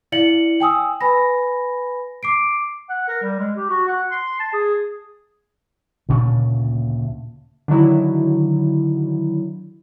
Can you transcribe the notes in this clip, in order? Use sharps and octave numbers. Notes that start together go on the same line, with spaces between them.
E4 D5 F5 C#7 F#7
G5 G#5 D#6 E6
B4 G#5 B5 A#6
D6 C7 D7
F#5
A#4
G3
G#3
G4
F#4
F#5
C6
A5
G#4
D2 A#2 C#3 D4
D3 D#3 F#3 E4